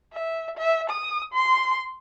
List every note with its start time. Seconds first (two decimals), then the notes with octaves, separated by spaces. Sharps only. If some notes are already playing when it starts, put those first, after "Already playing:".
0.13 E5
0.58 E5
0.90 D#6
1.34 C6